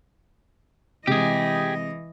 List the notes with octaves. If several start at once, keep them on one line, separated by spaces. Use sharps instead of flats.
C3 E3 G#3 G4 G#4 D#5